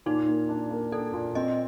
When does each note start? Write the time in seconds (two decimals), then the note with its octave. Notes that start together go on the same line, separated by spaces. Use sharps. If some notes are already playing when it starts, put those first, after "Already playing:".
0.06 A#2 D#4
0.28 A#3
0.49 D4
0.71 A#3
0.92 D4 A4
1.13 A#2
1.35 C4 D#5